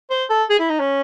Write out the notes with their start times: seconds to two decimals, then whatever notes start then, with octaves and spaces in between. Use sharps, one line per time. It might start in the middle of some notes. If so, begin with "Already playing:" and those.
0.10 C5
0.30 A4
0.49 G#4
0.59 E4
0.69 D#4
0.79 C#4